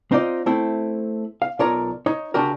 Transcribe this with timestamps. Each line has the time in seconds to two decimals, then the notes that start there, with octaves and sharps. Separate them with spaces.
0.11 C4 D#4 F4 D5
0.46 A3 C4 E4
1.42 F5
1.59 B1 F4 A#4 C#5 D5 A#5
2.06 D#4 C#5
2.34 C#3 D4 F#4 G4 A#4